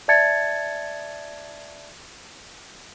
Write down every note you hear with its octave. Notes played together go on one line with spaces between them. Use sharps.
D5 E5 A5 G#6 A6 C#7